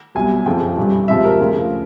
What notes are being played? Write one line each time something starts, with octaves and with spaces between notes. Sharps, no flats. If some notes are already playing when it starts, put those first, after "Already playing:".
C2 B2 F#3 G#5
F2 C#3 F3 G5
G2 E3 G3
C#2 C3 F3 E5
A#4
D2 C#3 F3